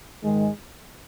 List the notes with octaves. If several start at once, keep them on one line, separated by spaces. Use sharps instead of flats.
G#2 D#3 G#3